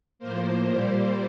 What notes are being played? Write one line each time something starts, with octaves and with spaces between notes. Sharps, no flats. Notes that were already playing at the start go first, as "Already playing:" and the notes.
A2 F3 A#3 C5
A#2 G3 A#3